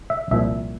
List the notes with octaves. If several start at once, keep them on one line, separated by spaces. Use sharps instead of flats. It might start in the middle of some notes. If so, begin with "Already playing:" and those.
E5
C2 A#2 F3 E5